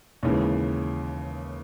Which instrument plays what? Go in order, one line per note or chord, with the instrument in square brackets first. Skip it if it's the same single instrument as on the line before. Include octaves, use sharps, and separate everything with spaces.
[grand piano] D#2 C#3 E3 G#3